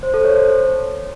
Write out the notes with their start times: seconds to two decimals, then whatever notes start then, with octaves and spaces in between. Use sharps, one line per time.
0.03 C5
0.14 A4
0.25 C#5
0.36 C5